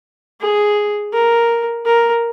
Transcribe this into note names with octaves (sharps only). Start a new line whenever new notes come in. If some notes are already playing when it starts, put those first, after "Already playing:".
G#4
A#4
A#4